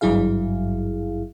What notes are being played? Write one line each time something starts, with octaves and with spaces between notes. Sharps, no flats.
G#1 G2 F#3 E4 G#4 F5